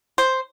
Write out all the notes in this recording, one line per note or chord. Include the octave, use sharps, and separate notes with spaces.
C5